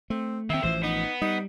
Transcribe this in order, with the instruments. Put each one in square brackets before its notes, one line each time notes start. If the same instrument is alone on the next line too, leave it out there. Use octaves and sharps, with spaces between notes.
[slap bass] A3 [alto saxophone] C4
[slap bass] D#3 C4 [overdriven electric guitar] A#3 G5 [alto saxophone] E5
[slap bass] A1 E3 F3 [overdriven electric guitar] C5
[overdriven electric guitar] B3 [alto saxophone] D#4
[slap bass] G3 [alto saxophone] D#4